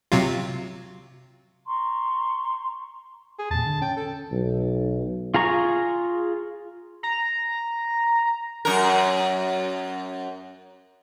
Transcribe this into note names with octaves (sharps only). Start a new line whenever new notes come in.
C3 F#3 F4
A#5 C6 C#6
G#4
E2 A#2 A5
D3
C#4 G5
A4
B1
F4 G#4 A#5 C#6
A#5
F#2 A#4